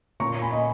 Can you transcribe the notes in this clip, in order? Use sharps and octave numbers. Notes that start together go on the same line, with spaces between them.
A#2 A#3 C#4 A#5 C#6
G#5 B5
D#5